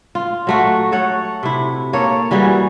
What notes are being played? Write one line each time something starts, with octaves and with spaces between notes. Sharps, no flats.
F4
F#3 A3 F#4
A4 C#5 F#5
C3 E4
A#3 A4 C#5
E3 G3 F#4 G#4